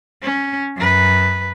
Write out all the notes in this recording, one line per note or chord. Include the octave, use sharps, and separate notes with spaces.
C#4
F#2 B4